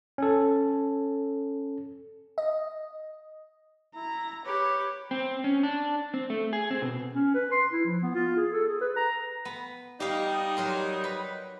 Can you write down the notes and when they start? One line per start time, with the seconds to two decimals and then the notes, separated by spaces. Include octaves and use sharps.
0.18 C#4 A4
2.38 D#5
3.95 E4 A#5
4.46 G4 B4 C#5
5.11 C4
5.44 C#4
5.63 D4
6.14 C4
6.30 A3
6.53 G#4
6.71 C4
6.82 B2
7.14 C#4
7.35 B4
7.52 C6
7.72 E4
7.86 F3
8.03 B3
8.16 F4
8.37 G#4
8.52 A4
8.68 G#4
8.81 B4
8.96 A#5
9.45 B3
10.00 G3 D#4 G4 F5
10.57 F#3 A#4 C6
11.04 B4